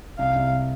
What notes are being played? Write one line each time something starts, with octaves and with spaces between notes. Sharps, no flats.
C2 F5
C2